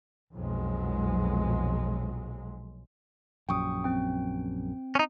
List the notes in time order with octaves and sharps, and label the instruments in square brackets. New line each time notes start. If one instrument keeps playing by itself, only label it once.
[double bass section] B1 F2 A#2 F#3 G#3
[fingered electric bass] A#1 F#2 [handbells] G5 C#6 D#6
[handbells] C4 G5
[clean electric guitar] C#4 D#4